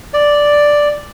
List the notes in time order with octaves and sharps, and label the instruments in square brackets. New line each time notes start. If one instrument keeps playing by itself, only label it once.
[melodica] D5